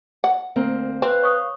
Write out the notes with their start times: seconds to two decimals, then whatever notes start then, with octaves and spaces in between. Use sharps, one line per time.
0.24 F#5
0.56 D2 A#3 C4 A#4
1.02 C4 B4 F5
1.22 C#5 C#6 D#6